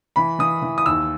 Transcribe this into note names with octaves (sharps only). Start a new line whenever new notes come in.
E3 B5
E3 D#6
E3
D#6
D#2 E6